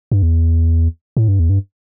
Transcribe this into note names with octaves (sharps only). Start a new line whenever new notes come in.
G2
E2
A2
G2
E2
G2